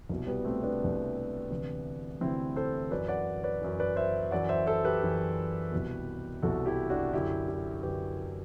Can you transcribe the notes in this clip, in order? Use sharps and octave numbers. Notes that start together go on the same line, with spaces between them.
C2 B2
G3 B3
A3 C4
B3 D4
C2 B2
D2 C3 E3
D2 C3 E3 C4 E4
A4 C5
F#2 E3 B4 D5
D5 F#5
B4 D5
F#2 E3
B4 D5
C5 E5
F#2 E3 D5 F#5
C5 E5
A4 C5
G4 B4
F#2 E3
C2 B2
C2 B2 F#4 A4
E4 G4
D4 F#4
F#2 D3 E4 G4
E4 G4
F#2 D3 G4 B4